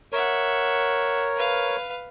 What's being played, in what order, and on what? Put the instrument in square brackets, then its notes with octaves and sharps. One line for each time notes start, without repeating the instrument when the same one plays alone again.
[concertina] A#4 C#5 [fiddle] E5 F#5
[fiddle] B4 F5